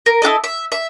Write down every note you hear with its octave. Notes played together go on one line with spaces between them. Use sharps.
A#4
E4 F#4 A4 D#5
E5
E5